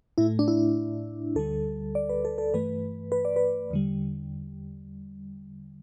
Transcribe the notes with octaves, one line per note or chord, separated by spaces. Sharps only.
A2 A3 E4
D4
E4
D2 D3 G3 A4
D5
B4
A4
A4
G2 E3 A3 B4
B4
D5
B4
E2 D3 G3